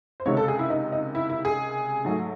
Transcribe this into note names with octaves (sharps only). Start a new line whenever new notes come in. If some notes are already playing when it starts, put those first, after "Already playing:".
C5
C#2 C3 D#3 G#3 C#5
A4
G#4
E4
D#4
D#4
E4
E4
G#4
G#2 F#3 A3